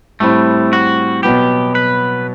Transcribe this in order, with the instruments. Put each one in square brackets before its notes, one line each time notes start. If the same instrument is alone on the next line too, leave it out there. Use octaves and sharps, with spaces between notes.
[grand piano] A2 G3 C4 E4 [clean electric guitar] A3
[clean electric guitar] F#4
[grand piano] B2 F#3 B3 [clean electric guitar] G4
[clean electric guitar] B4